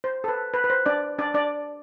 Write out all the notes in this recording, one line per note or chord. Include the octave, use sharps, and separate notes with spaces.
C5
A4
B4
B4
B4
C5
D4 D5
D4 D5
D4 D5